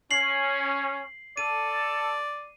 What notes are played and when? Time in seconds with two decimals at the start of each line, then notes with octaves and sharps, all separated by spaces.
0.11 C#4 C7 F#7
1.37 A4 D5 D#7